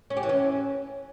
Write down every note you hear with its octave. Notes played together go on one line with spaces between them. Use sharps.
C#4
G4
E3
C#4